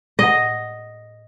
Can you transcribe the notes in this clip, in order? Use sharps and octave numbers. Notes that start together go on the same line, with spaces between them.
A2 D#5 F#5